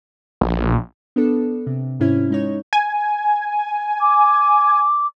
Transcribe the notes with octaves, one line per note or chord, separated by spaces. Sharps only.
A#1
B3 D4 A4
C3
G#2 C3 C#4 E4
G#3 D#4 C#5
G#5
D6